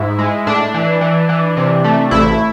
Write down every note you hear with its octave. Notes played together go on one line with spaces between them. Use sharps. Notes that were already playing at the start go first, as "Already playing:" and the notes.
Already playing: G#2 E4
G#3
A2 D4
E3
E3
E3
C3
A3
A1 E4